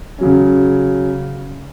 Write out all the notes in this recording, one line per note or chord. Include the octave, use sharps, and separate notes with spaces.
C#3 F#3 C#4